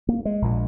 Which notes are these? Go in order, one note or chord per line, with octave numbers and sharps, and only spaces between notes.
A#3
G#3
A#1 A#2